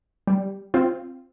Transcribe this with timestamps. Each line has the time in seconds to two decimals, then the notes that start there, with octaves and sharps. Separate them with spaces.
0.27 G3
0.74 C4 F4